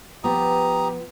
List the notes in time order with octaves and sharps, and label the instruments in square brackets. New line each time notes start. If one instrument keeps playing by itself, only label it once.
[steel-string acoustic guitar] F3 B3 [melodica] G4 A#5 D#6